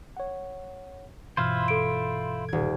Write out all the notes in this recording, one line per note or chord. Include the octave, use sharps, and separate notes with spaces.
C#5 F#5
G2 B2 E3 E4 F4 C5 C6 F6
A4 D7
D#1 G#6